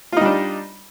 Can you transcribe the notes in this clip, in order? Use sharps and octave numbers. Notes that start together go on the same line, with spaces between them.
G3 D4 D#4 F4